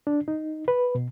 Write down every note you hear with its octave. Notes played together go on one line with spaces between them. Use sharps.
D4
D#4
B4
B2